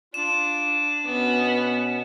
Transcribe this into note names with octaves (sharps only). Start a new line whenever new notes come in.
D4 F4 E7
B2 B3 C#4